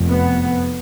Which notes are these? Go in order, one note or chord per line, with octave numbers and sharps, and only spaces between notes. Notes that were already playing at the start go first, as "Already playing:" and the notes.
Already playing: F1 F2
B3